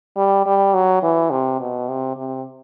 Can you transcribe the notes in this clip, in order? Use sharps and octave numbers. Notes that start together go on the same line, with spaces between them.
G3
G3
F#3
E3
C3
B2
C3
C3